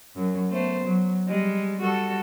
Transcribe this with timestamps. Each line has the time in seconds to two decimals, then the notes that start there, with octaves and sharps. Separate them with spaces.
0.16 F#2 F#3
0.51 A3 B3 C5
0.85 F#3
1.27 G3 G#3
1.79 G3 F#4 A4